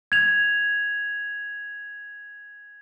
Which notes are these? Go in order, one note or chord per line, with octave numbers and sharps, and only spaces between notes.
G#6 F7